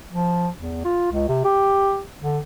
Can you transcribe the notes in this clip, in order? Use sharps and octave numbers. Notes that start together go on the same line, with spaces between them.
F3
E2
F4
C#2
C3
G4
D3